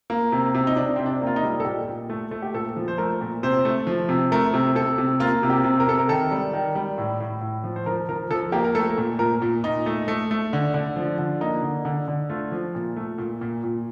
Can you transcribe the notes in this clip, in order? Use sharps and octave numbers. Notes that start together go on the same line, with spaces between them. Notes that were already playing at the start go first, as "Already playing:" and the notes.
A#3
C3
C3
D#4
C3 D4
C3 C4
D4
A#3
F4
D#4
G3
A4
A#2 G4
A#2
A3
A3
G4
A#2 A4
F3
C5
A3 A#4
A#2
C3 C5
A3
F3
C3
A3 A#4
C3
C3 A4
C3
A#3 F4
C3
G4
C3
A#4
C3 A4
A#4
D#3 A4
G3
D#3
G3
A2
A2
A2
F3
C5
F3 A#4
F3 A#4
F3 A4
A#3 G4
A#4
A3 A4
A#2
A#2 A#4
A#2
A#2 D#4
A3
A3
A3
D3
D3
F3
D3
A#3 D#4
D3
D3
D3
A3 F4
F3
A#2
A3
A#2
A#2
A#2